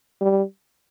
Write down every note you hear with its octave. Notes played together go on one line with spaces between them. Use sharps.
G3